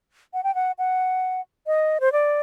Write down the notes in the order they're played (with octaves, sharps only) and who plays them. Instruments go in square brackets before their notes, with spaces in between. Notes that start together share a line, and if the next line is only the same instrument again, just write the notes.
[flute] F#5
G5
F#5
F#5
D#5
C5
D5